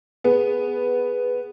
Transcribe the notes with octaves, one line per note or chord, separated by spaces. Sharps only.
B3 G#4